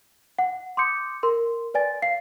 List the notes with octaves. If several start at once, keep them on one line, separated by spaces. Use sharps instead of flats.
F#5
C6 D6 D#6 G6 C#7
A#4 C6
B4 D5 G#5 A6
F5 C7